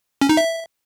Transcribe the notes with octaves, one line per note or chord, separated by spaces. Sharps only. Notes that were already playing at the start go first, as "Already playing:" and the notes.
C#4
D#4
E5